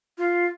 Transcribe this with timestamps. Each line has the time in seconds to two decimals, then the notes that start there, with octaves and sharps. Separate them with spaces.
0.18 F4